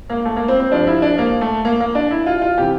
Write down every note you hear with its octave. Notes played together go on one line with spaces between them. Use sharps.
A#3
A3
A#3
C4
C4
G2 F3 D4
E4
D4
A#3
A3
A#3
A#3
D4
E4
F4
F4
C3 E3 G4